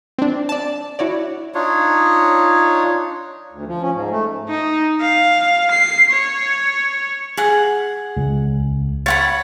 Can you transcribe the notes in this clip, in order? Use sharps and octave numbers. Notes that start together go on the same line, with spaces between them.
C4 D4
D5 A5
E4 F#4 C#5 D5
D4 D#4 F4 C#5
D2
F3
C#4
G#2
A3
D#4
F5
C7
C#5
G#4 F#5
C#2
C#5 F#5 B5 A6